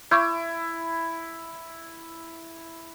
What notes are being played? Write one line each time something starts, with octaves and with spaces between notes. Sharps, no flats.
E4 C#6 D6 G6